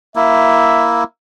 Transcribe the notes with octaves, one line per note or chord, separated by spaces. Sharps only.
A#3 E4 E5